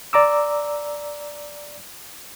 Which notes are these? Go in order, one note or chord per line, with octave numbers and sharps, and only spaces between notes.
D5 A#5 D6 E6